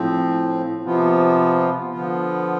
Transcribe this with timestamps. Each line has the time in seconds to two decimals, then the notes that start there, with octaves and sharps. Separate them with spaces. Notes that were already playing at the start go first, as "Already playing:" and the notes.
Already playing: A2 F3 C4
0.83 C3 F3 B3 F4
1.91 D3 F3 B3 F4